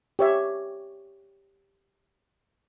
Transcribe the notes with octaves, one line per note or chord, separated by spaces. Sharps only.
G4 C#5 E5